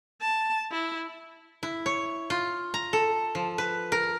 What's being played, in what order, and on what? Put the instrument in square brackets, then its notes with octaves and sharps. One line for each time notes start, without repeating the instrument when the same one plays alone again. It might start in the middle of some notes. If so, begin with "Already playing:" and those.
[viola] A5
E4
[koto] E4
C#5
F4
A#5
A4
F3
B4
A#4